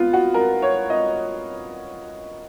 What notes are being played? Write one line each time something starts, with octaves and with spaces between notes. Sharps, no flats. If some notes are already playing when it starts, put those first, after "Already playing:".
Already playing: B3 F4
F#4
A#4
C#5
D#5